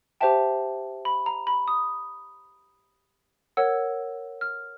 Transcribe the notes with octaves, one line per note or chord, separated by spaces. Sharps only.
G4 C5 E5 G5 A5
B5
A#5
B5
D#6
A#4 C#5 F#5 E6
F6